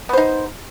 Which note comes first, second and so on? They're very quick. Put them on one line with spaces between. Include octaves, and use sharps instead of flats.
B3 C5 D#4